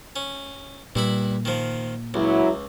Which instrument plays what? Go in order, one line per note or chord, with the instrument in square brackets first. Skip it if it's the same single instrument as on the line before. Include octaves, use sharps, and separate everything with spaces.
[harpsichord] C#4
[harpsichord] G2 E4 B5 [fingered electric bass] A#2
[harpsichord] D#3 F3
[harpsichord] C#2 [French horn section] F#3 E4